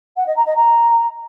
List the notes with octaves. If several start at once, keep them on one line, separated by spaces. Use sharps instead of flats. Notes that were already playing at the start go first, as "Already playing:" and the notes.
F#5
D#5
A#5
D#5
A#5